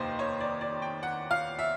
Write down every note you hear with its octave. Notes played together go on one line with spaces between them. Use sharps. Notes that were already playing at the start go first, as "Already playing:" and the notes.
Already playing: F1 D#2 D#3 A#3 C5 D#5
C#5
D5
D5
G5
F#5
F5
E5